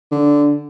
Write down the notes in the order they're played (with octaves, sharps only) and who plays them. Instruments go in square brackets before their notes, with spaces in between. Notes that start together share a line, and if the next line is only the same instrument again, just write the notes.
[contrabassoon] D3